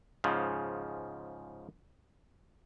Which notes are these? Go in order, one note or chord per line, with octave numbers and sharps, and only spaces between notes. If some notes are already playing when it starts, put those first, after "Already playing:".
G#2 C#3 F3